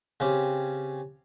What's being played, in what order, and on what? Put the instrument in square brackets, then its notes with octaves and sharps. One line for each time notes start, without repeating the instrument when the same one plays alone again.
[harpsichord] C#3 C4 C#4 G4